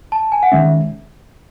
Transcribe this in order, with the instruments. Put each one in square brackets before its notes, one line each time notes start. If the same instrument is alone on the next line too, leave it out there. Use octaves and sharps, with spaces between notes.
[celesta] A5
G#5
F#5
[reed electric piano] D#3 G#3 C#4 [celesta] E5